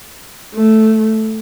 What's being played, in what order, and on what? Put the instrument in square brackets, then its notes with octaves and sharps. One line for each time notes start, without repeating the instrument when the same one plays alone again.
[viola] A3